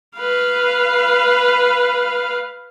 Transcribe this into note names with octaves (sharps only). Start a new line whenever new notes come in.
B4 F5